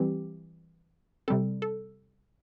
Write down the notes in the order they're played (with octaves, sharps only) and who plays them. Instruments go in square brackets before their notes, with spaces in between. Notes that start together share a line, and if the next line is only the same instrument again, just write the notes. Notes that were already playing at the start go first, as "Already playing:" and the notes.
Already playing: [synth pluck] E3 G3 C4 G4
C3 G3 C4 A4
A4